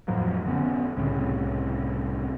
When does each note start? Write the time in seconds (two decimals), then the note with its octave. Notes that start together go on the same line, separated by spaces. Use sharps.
0.08 F2 A2 F3 F#3
0.46 D3 B3 C#4
0.97 C2 A2 C#3 C4